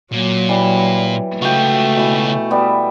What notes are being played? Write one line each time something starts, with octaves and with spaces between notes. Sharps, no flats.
A#2 F#3
E3 G3
C#3 A3 F4 F#4 G5
B2 E3
G3 B3 E5